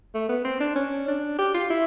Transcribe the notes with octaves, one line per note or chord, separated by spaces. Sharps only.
A3
B3
C4
D4
C#4
D4
G4
F4
E4